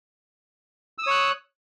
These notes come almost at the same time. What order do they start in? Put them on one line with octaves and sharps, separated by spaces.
E6 D#6 C#5 F#6